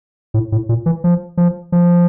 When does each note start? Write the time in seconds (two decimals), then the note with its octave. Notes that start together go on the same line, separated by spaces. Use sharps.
0.34 A2
0.52 A2
0.69 A#2
0.86 E3
1.04 F3
1.37 F3
1.72 F3